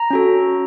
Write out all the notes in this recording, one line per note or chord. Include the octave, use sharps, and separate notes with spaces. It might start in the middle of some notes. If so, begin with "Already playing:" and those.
Already playing: A#5
C#4 F#4 A4